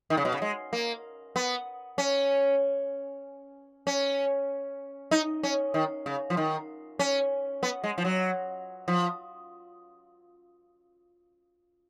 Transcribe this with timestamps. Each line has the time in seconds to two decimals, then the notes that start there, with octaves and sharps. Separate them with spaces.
0.10 D#3
0.17 C#3
0.25 B2
0.32 C#3
0.42 G#3
0.73 A#3
1.36 B3
1.98 C#4
3.87 C#4
5.11 D#4
5.43 C#4
5.74 D#3
6.06 C#3
6.30 F3
6.37 D#3
6.99 C#4
7.63 B3
7.84 G#3
7.98 F3
8.05 F#3
8.88 F3